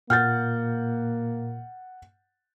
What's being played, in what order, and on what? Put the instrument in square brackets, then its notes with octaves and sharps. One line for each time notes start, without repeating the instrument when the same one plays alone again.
[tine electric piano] A#2 [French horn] A#3 [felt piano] F#5 G6 A6 [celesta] F6